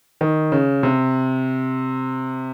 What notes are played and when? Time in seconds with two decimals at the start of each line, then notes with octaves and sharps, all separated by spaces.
0.21 D#3
0.52 C#3
0.83 C3